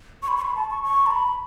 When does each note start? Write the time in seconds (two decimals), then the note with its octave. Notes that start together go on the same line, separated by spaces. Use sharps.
0.23 C#6
0.28 B5
0.37 C#6
0.42 B5
0.56 A5
0.70 C#6
0.84 C#6
1.06 A5
1.11 B5